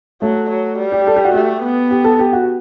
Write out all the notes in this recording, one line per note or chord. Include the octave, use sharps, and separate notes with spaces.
F#3 A3
F#3
G3
G4
A4
G4
F#4
A3 G4
B3
G4
A4
G4
F#4